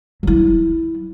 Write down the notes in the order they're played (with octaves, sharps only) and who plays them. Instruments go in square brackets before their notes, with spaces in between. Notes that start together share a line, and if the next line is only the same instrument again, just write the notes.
[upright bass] F#3 E4